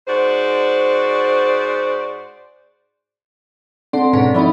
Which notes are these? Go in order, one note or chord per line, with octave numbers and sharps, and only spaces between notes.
G#2 F#4 C5 D5
D3 C4 D5 C6
G#2 B2 C#4 A#5
F3 C4 D#4 E4 D5